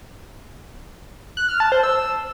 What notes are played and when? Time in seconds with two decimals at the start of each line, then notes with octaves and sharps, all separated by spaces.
1.37 F#6
1.49 F6
1.60 A5
1.72 C5
1.83 E6